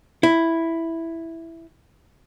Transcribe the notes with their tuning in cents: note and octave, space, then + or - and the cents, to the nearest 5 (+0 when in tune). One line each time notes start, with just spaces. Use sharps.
E4 +0